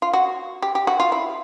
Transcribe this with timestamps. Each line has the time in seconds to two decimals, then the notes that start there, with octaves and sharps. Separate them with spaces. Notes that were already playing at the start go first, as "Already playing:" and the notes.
0.02 F4
0.13 F#4
0.62 G4
0.75 G4
0.87 F#4
1.00 F4
1.12 E4